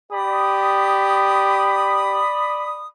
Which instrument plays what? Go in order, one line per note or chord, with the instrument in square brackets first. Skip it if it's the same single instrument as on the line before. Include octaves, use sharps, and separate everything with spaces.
[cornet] G4 [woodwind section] D5 B5 D#6